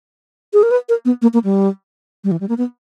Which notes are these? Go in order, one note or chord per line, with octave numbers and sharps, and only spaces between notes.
G#4
A#4
B4
A#4
B3
A#3
A#3
G3
G3
E3
G3
A#3
B3